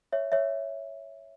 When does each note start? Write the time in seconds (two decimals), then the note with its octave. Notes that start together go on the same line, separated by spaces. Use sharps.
0.12 C#5 E5
0.32 C#5 E5